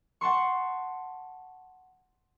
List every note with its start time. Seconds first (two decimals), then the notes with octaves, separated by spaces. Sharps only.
0.21 F#5 A5 C6 C#6